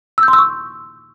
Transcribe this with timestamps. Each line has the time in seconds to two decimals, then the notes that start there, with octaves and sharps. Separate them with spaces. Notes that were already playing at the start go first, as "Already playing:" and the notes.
0.18 E6
0.23 G6
0.28 C6
0.33 E6
0.38 C#6